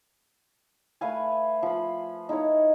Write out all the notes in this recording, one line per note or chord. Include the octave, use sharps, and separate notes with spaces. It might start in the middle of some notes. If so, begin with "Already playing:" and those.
A3 B4 F5 G#5
F3 B5
D#4 E4 A#4 C#5